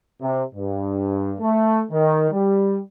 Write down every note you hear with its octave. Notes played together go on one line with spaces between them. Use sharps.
C3
G2
A3
D#3
G3